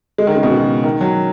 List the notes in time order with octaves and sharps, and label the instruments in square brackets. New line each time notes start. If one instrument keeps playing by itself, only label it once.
[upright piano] G#3
D#3
C#3
B2
C#3
D#3
F#3